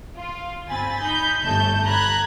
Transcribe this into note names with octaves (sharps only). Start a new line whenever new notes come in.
F4
G1 C4 G#5 B5 A6
D#4 B5 G6
G1 A3 A5 G6
A#5 B5 F#6 G#6